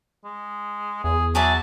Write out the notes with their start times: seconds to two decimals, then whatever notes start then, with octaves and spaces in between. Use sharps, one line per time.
0.25 G#3
1.04 E2 G#4
1.35 F#3 G#4 D5 E5 A5